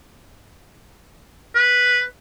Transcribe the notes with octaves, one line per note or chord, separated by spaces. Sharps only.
B4